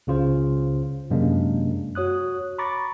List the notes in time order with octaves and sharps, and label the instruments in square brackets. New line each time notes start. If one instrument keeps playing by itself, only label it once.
[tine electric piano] C#2 C#3 F4 C5
F#2 C3 G#3 A#3 D4
F#4 C#5 D#6 F#6
A#5 B5 C#6 D6 A6 A#6